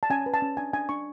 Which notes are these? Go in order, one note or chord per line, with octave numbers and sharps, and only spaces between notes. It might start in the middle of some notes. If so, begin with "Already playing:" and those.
A5
C#4 G#5
B4
A5
C#4
D4 G#5
D4 G#5
D4 C#6